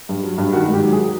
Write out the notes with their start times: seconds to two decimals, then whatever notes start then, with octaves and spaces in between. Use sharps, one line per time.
0.09 G2
0.23 F#3
0.38 G2
0.53 D#3 F#4
0.68 G#2
0.73 G4
0.83 F#3
0.93 G#4